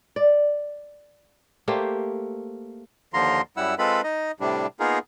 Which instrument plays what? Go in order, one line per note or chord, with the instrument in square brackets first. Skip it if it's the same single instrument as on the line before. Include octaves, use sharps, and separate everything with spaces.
[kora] D5
A3 A#3 G4 C5
[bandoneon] D#2 D3 F3 F4 A#5 C6
F#2 G3 E4 F#5 E6
G#3 C4 F4 A4 B4 B5
D#4 D#5
A2 C3 G3 D4
A#3 B3 D#4 F4 G#4 A#4